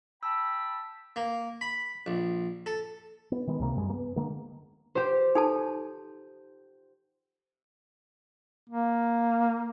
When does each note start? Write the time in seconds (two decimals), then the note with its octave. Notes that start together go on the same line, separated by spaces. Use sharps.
0.23 G5 A5 B5 E6
1.16 A#3
1.61 B5
2.06 A#1
2.66 A4
3.32 B3
3.47 D#3 G#3 B3
3.60 C#2 C3 A#3
3.76 F#2 G3 G#3
3.90 A#3 B3
4.16 D3 G#3 A#3
4.95 G4 C5
5.35 D#4 A4 A5
8.69 A#3